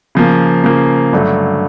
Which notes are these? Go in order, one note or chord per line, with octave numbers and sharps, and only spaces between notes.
C#3 F3 A#3
C#3 F3 A#3
G2 D3 F#3 A3